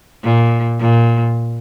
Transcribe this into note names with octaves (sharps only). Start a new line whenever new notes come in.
A#2
A#2